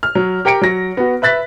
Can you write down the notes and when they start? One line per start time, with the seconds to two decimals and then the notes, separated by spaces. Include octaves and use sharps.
0.03 F6
0.15 F#3
0.45 G4 A#4 G5 C#7 D7
0.62 F#3 A#6
0.97 B3 F#4
1.22 B4 E5 F#6 A6 B6